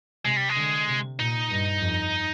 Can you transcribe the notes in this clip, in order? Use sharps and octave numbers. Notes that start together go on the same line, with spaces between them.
C3 G#3
G3
G#3
D3
C3
A#2 D#4
G2
F2